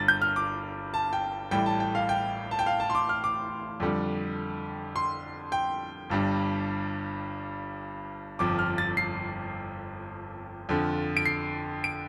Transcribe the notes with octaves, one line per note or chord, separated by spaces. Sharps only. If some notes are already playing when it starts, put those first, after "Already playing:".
Already playing: G1 G2 G3 A6
G6
F6
D6
A5
G5
A1 A2 G3 G5
A5
G5
F5
G5
A5
G5
F5
A5
C6
D6
F6
D6
F2 D3 G3
C6
G5
G1 G2 G3
G1 F2 F3 D6
F6
A6
C7
F2 D3 F3
D7
C7
D7